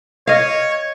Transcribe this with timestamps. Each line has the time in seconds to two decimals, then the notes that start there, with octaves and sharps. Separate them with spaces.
0.27 C#5 D#5 F5